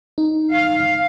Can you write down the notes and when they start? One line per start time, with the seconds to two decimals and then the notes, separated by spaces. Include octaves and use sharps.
0.18 D#4
0.53 F5